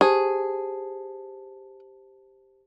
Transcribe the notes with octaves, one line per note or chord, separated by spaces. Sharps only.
G4 G#4 C5 A5